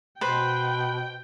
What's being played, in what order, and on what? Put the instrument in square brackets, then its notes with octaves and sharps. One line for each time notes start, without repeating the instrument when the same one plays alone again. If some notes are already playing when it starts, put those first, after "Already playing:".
[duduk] B2 [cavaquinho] B4 C5 [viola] G5